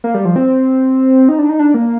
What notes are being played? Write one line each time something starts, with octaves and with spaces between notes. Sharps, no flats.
A#3
G3
F3
C4
D#4
D4
D#4
D4
A#3